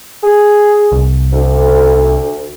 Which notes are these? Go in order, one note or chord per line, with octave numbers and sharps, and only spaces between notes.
G#4
C2
D2